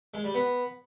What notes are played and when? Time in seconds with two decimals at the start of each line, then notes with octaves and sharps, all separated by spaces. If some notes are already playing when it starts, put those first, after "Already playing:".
0.14 G#3
0.24 G3
0.34 B3